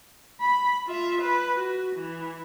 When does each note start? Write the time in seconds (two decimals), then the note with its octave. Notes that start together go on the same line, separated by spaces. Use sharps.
0.41 B5
0.87 F4 E5
1.21 B4
1.55 F#4
1.96 E3